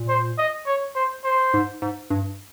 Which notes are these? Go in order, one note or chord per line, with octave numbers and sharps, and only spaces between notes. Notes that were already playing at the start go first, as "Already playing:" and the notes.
Already playing: A#2
C5
D#5
C#5
C5
C5
G#2
G#2
G2